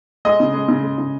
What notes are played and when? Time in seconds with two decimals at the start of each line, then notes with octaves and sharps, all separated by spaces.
0.25 G#3 D#5
0.40 C#3
0.54 G#3
0.68 C#3
0.83 G#3
0.98 C#3